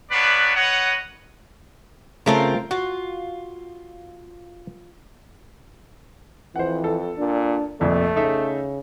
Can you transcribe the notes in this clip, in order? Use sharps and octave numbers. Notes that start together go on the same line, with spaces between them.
A#3 B3 D4 B4 C#5 D5
B4 C#5 D#5 F#5
C#3 A3 C4 F4 A#4
F4 F#4
F2 E3 C5 F#5
A4
A#2 D4
F1 A#1 F2 A3 D5
C#3 D#4 A4 E5